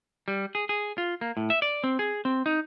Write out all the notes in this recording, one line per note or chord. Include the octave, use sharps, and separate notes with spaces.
G3
G#4
G#4
F4
A#3
A2
E5
D5
C4
G#4
C4
D#4